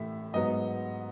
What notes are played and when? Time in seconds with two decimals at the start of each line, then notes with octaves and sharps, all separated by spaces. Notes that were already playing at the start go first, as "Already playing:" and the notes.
Already playing: A1 A2 E5
0.34 G#2 F#3 B3 D#5